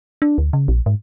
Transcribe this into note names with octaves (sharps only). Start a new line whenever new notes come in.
D4
D2
C#3
A#1
G#2